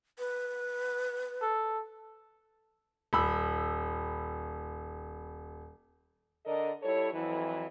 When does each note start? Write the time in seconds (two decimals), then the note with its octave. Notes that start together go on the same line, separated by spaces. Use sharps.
0.19 B4
1.42 A4
3.13 D#1 B5 E6
6.45 D3 A4 A#4 D5 D#5
6.82 G3 E4 A4 C#5
7.12 F2 E3 F#3